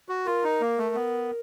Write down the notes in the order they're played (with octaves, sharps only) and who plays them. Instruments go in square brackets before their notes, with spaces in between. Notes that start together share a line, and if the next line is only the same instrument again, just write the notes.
[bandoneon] F#4
[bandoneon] F4 [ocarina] A#4
[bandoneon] D#4
A#3
A3
B3